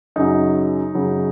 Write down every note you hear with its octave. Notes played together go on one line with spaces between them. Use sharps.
F#2 C#3 F#3 D#4
F#2 C#3 F#3